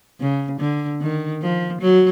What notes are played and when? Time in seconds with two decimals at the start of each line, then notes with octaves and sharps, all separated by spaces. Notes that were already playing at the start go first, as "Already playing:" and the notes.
0.20 C#3
0.60 D3
1.01 D#3
1.42 F3
1.81 F#3